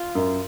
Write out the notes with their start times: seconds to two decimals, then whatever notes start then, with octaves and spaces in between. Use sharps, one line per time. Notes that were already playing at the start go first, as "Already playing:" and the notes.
Already playing: F4
0.15 F#2